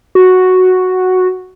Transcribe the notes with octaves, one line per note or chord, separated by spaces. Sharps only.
F#4